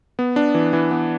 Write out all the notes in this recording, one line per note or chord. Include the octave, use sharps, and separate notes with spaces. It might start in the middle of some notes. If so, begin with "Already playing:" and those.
B3
D4
E3
E3
B3